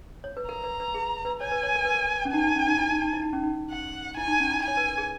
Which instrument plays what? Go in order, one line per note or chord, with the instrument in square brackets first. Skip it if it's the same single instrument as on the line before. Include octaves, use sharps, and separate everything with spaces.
[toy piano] C#5
B4
[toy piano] A#4 [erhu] A#5
[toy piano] B4
B4
G#4
B4
[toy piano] C#5 [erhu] G#5
[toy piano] B4
C#5
A#4
B4
A#4
C#4
[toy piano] D#4 [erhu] G#5
[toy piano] D#4
C#4
D#4
E4
D#4
D#4
E4
D#4
C#4
D#4
[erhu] F#5
[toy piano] E4 [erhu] G#5
[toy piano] D#4
C#4
E4
[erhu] G#5
[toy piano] C#5
B4
A#4
G#4